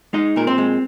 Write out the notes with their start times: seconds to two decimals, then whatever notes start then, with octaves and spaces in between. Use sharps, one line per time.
0.13 G#3 D#4 D#5
0.36 A#2 A#4
0.47 C4 C5
0.58 G#3